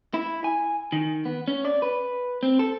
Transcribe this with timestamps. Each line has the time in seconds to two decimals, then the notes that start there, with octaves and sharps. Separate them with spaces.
0.14 E4
0.44 G#5
0.92 D#3
1.25 B3
1.48 C#4
1.65 D5
1.82 B4
2.43 C4
2.59 A4